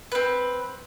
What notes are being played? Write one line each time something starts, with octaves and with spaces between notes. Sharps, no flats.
C4 B4